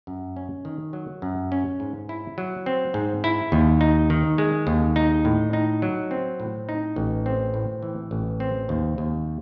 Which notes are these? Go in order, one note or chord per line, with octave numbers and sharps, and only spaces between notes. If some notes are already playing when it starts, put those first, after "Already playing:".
F#2
C#4
D#3
F#3
F#2
C#4
G#2
E4
F#3
C4
G#2
E4
D#2
D#4
D#3
G#3
D#2
D#4
A2
D#4
F#3
C4
A2
D#4
A1
C4
A2
E3
A1
C4
D#2
D#2